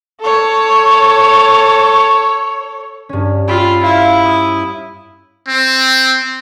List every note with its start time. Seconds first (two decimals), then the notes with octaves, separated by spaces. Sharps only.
0.20 A4 C#5
3.09 G2 C#4
3.48 F4 G5 B5 E6
3.83 E4 F5
4.25 D#6
5.48 C4